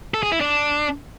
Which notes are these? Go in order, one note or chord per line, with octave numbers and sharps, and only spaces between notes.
A4
G#4
E4
D4